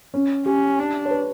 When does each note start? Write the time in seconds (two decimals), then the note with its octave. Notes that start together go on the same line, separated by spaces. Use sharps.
0.14 C#4
0.46 C#4 G4
0.79 D4
1.05 C#5
1.11 B4